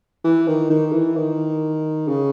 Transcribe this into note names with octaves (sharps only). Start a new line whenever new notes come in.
E3
D#3
D#3
E3
D#3
C#3